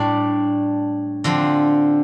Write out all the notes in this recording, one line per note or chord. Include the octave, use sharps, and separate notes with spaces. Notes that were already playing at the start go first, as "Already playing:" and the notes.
Already playing: A2 G3 D4
D3 F3 C4